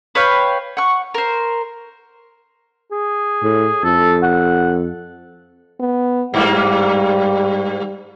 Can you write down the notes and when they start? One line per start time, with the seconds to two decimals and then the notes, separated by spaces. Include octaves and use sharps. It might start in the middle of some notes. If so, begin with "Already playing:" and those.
0.15 B4 C#5 F5 G5
0.77 F#5 C#6
1.14 A#4 C5
2.91 G#4
3.43 A2
3.84 F2 A4
4.23 F#5
5.80 B3
6.34 G2 G3 A#3